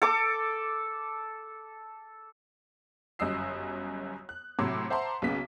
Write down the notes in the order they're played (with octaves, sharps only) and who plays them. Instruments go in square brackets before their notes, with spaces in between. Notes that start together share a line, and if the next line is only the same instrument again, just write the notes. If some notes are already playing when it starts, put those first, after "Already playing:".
[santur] A4 D6
[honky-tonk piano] G1 F#2 D#5 D#6 E6 C7
F#6
A2 C3 F#3 C6 D6 E6
C5 E5 F#5 A5 A#5 C6
B1 C#3 B3 B6